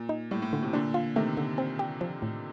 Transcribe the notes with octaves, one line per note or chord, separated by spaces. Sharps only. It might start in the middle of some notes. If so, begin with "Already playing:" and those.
Already playing: A#2
D#4
A2 G3
A2
A#2 D3
A2 C3
A#2 D3 D4
F4
C3 D#3 A3
D3
C4
G4
F3
A2